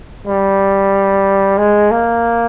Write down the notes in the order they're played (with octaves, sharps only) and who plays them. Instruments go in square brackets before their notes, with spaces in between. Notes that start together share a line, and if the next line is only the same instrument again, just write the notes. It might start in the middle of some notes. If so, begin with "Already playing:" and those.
[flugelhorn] G3
G#3
A#3